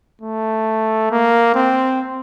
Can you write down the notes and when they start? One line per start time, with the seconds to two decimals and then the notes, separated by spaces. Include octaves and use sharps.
0.22 A3
1.11 A#3
1.55 C4